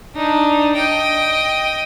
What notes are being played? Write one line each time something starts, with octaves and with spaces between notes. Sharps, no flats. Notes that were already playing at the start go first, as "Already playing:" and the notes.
D4 D#4
D#5 G5